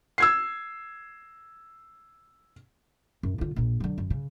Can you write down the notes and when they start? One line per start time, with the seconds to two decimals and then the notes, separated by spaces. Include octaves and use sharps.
0.18 E6 G#6 C7
3.23 F#2
3.38 D3 F4
3.56 A#1 A#2
3.80 D3 F#3
3.98 F#2
4.10 C#3